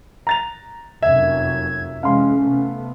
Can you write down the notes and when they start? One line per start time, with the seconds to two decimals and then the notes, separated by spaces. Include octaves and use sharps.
0.27 A#5 A6 F7
1.03 F1 F#2 F#3 E5 G#6
2.03 C3 E3 G#3 C#4 F5 C6
2.41 C3 A3 B3